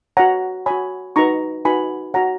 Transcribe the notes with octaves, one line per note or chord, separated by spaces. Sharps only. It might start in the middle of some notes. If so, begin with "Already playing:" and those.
F#4 C#5 F#5 A#5
F#4 C#5 G#5 B5
D#4 F#4 B4 A#5 C#6
D#4 F#4 B4 G#5 B5
F#4 C#5 F#5 A#5